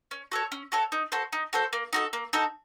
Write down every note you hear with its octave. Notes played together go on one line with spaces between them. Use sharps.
C#4
F#4 A4 C#5
C#4
F#4 A4 C#5
D#4
F#4 A4 C5
D#4
F#4 A4 C5
A#3
D#4 F#4 A4
A#3
D#4 F#4 A4